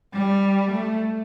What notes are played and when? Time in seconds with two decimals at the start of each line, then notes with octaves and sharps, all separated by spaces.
0.14 G3
0.72 A3